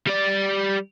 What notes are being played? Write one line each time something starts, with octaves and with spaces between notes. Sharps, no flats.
G3 D5